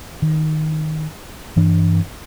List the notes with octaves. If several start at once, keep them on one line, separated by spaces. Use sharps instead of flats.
D#3
G2 E3 D4